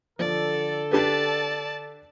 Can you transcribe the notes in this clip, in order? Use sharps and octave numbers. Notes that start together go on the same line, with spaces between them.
D3 F3 A4 D5
D4 G4 B4 D5 A5